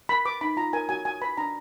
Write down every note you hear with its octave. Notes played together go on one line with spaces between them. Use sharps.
A#4 B5
B4 D6
D#4 B5
F4 A#5
A#4 G#5
F#4 G#5
F#4 G#5
B4 B5
D4 A#5